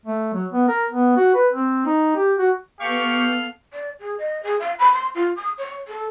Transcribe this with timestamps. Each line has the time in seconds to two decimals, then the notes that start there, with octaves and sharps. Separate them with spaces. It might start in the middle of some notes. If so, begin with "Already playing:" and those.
0.06 A3
0.34 F#3
0.52 B3
0.68 A#4
0.90 B3
1.17 F#4
1.35 B4
1.53 C4
1.86 D#4
2.16 G4
2.39 F#4
2.80 B3 G4 A4 F5 C#6
3.73 D5
4.00 G#4
4.18 D#5
4.43 G#4
4.59 F5
4.79 B5
4.93 C6
5.15 F4
5.36 D#6
5.58 C#5
5.88 A4